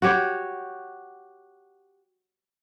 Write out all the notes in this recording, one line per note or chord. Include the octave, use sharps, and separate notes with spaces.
F#4 G4 C#5